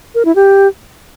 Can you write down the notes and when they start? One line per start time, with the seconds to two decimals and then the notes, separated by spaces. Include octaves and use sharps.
0.15 A#4
0.25 E4
0.36 G4